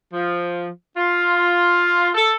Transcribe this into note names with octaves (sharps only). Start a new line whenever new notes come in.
F3
F4
A4